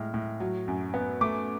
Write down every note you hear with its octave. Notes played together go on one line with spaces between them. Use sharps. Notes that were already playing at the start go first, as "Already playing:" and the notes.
Already playing: A2 G#3 F6
A2
F#3
F#2
B3
A3 D6